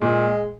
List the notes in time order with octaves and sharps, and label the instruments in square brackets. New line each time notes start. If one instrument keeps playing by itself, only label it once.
[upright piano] A#2 [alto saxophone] G#3